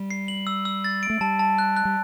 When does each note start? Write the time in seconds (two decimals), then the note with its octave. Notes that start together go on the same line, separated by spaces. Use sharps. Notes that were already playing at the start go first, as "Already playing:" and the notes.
Already playing: G3
0.11 C7
0.28 F#7
0.47 E6
0.65 E6
0.84 A6
1.03 D7
1.10 A3
1.21 G3 A5
1.39 A5
1.58 F#6
1.76 F#6
1.85 G3